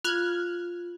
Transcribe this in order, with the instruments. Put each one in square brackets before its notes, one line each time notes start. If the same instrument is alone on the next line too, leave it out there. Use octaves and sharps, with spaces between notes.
[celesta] F4 [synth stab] F6 F#6 G#6